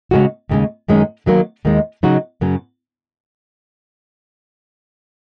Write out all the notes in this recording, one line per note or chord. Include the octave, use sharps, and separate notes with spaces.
C#3 G#3 C#4 F#4
D#2 C#3 G#3
F#2 D#3 G#3 C#4
D#3 F#3 A#3
D#2 D#3 G#3
C#3 F#3 D#4 F#4
F#2 C#3 F#3 C#4